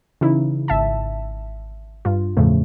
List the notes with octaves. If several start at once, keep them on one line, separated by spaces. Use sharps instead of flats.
C#3 E3 D#4 E4
G#1 E5 A5
G2 F4
E2 A2 C#3 F3 A3